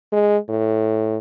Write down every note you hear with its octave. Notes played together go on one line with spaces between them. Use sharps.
G#3
A2